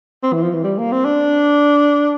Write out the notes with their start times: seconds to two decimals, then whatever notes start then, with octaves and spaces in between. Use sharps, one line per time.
0.23 C4
0.33 E3
0.43 F3
0.54 E3
0.64 G3
0.78 A#3
0.92 C4
1.05 D4